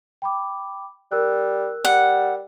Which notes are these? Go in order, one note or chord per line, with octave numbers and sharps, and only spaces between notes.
G5 B5 D6
G3 A#4 E6 F#6
G3 F#5